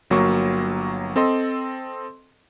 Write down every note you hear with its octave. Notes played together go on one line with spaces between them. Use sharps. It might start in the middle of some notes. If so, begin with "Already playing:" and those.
G1 F#3 A#3 C#6
C4 A4 D#5 C6